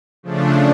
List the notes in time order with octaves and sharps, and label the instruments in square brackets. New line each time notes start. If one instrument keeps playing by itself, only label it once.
[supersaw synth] C#3 F3 A3 D4